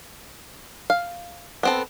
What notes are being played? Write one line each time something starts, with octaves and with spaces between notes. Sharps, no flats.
F5
B3 C4 A4